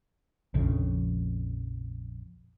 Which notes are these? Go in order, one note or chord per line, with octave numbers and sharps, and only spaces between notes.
A#1 F2 C#3